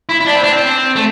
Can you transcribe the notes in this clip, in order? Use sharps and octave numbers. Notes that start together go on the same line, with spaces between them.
E4
E4
D4
C4
D4
C4
A3